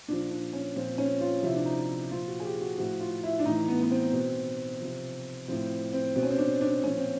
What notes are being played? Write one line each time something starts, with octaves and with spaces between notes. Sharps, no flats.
A#2 F3 D4
D4
C#4
A#2 F3 C4
C#4
F4
C3 F3 E4
D4
D#4
A#2 F3 F4
F#4
G#4
G4
F#4
A2 F3 F#4
F4
E4
D4
A2 E3 D#4
B3
B3
C4
B2
C3 F3
A2 F3 C4
C4
B2 C4
C#4
C4
D4
D4
A#2 F3 C#4
C4